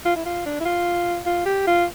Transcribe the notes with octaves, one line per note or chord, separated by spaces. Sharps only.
F4
E4
F4
D4
E4
F4
F4
G4
F4